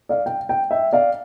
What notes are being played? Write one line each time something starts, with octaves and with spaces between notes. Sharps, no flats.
D5 F5
G5
G5
E5 G5
D5 F5